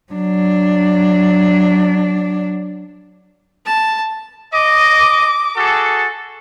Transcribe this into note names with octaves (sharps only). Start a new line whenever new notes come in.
F#3 D4
A5
D#5 D6
F#4 G#4 A4